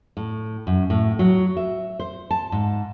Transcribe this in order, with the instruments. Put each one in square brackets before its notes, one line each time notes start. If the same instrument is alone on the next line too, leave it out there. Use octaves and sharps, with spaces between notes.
[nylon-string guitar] A2
F#2
A2
F#3
E5
C5
A5
G#2